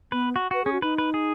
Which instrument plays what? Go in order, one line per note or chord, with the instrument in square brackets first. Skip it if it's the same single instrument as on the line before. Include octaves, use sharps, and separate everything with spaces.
[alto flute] B3 [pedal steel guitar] B4
[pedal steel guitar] F#4
[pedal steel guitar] F#4 [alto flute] B4
[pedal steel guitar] C#4 [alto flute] G#4
[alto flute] F#4
[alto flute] D#4 [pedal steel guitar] B4
[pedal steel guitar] B4
G#4